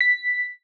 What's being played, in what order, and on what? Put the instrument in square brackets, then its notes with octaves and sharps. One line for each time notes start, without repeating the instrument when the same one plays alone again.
[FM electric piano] B6